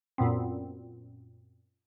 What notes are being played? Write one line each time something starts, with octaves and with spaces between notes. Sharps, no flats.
F#2 A#2 B3 C4